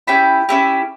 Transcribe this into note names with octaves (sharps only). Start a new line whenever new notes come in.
C#4 E4 G4 G5 B5
C#4 E4 G4